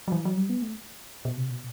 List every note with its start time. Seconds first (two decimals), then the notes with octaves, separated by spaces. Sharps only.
0.08 F#3
0.12 E3
0.25 F#3
0.37 G3
0.50 B3
0.62 A3
1.25 B2
1.37 C3
1.50 B2